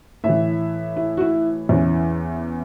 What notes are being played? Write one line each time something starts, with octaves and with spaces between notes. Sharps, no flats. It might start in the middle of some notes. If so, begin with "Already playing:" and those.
A2 E5
E3
E4
F#4
E4
E2 E3 C#4